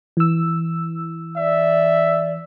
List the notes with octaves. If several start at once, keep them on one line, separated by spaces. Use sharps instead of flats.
E3 E6
D5 E5